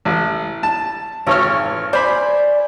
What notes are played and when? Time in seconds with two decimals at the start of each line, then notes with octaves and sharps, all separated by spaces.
0.05 A1
0.63 A5
1.26 G#1 E3 A3 F4 C#5 F6
1.93 C5 D5 G#5 B5